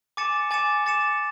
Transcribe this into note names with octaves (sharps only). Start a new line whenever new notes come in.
G#5 D6 A6 C#7 E7
G#5 D6 A6 C#7 E7
G#5 D6 A6 C#7 E7